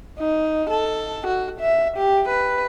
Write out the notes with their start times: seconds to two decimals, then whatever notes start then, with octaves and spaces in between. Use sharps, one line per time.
0.19 D#4
0.70 A4
1.27 F#4
1.60 E5
1.97 G4
2.29 B4